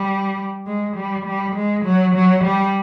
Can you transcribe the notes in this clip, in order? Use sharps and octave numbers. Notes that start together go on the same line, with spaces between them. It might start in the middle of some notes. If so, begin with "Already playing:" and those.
Already playing: G3
G#3
G3
G3
G#3
F#3
F#3
G3